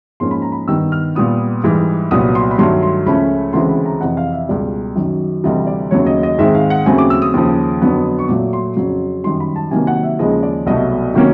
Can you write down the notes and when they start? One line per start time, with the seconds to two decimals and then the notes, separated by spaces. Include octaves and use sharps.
0.20 G#2 F3 A#3 C#4 C6
0.31 B5
0.42 A#5
0.52 B5
0.68 G2 D#3 G3 B3 E6
0.92 F6
1.15 A#2 G3 B3 D#6
1.64 G#2 E3 G3
2.11 C2 A#2 F#3 B3 D#6
2.35 C6
2.51 B5
2.58 G2 D#3 F#3 A3 C6
2.83 C6
3.06 C#2 C#3 F3 A3 C#4 B5
3.53 D2 C#3 E3 G#3 C4 C6
3.69 B5
3.86 A#5
4.01 F2 C3 E3 F#5
4.17 F5
4.33 E5
4.49 C#2 B2 G3 D5
4.96 F#2 D#3 F#3
5.44 D2 C3 E3 G3 D#5
5.67 D5
5.91 D#2 C#3 F#3 A3 C#5
6.06 D#5
6.23 D#5
6.39 G#2 D#3 G#3 C4 E5
6.55 F5
6.70 F#5
6.86 D#2 C#3 F#3 A3 C4 G#5
6.98 D6
7.10 E6
7.22 D#6
7.34 D#2 C#3 F3
7.82 F2 D3 F#3 B3
8.19 C#6
8.28 A#2 F#3 A3 D6
8.53 C6
8.76 F2 C#3 F#3
9.24 F#2 D#3 G3 C6
9.40 B5
9.56 A5
9.71 C3 D#3 F#3 A#3 G#5
9.87 F#5
10.03 E5
10.19 D#2 C#3 F3 G#3 D#5
10.43 D5
10.66 C2 B2 F#3 A3 D#5
11.14 C3 D#3 F#3 A#3 C#4